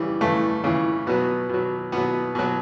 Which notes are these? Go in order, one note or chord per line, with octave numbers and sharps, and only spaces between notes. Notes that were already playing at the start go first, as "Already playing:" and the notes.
Already playing: C#3 E3 G3
C#3 E3 A3
C#3 E3
B2 F#3 B3
B2 F#3
B2 F#3 B3
B2 F#3